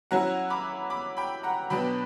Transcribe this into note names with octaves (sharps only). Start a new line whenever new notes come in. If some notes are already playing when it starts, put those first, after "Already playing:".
F#3 C#4 E4 F#5 A#5
B5 D6
B5 D6
G5 B5
F#5 A#5
B2 F#3 B3 D4 G5 B5